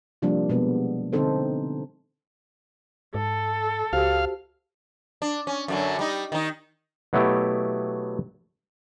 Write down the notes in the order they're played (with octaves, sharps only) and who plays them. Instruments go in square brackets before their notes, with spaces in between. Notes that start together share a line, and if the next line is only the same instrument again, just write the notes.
[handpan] C3 F3 G3 A#3 D4
B2 G#3 B3
D3 C4 D#4 A4 C5
[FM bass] G#2 [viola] A4
[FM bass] C#2 [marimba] F#4 G4 C5 [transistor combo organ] F5
[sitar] D4
C#4
F#2 D3 F#3
G3 D#4
D#3 D#4
[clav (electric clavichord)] B2 F#3 A3 B3 E4 G4